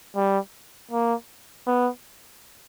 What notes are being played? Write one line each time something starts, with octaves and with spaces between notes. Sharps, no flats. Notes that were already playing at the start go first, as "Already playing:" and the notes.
G3
A#3
B3